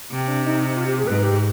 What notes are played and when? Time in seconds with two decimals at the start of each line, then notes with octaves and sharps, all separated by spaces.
0.11 C3 C4
0.28 D4
0.44 D#4
0.68 D#4
0.77 F4
0.87 G4
0.98 G#4
1.07 G#2 B4
1.23 G4